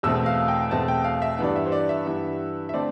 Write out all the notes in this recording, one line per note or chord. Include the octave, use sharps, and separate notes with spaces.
E2 B2 A3 C4 E6
F5
G5
E2 B2 A3 C4 A5
G5
F5
E5
G2 E3 B3 D5
E5
C5
D5
E5
G2 E3 B3
E5
D3 A3 C4 D5